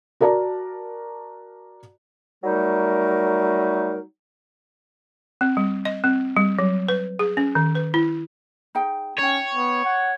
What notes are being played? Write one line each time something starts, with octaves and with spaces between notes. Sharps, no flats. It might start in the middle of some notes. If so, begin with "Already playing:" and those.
F#4 A#4 D5 A5 A#5
F#3 G3 A3 D#4 A#4
C4
G3
D#5
C4
G3
F#3
B4
G#4
C#4
D#3
B4
E4
D#4 G#4 G5
C#4 D#4 C#5 G5
B3
F#5